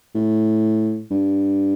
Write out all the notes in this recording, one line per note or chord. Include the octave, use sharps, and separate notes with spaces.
A2
G2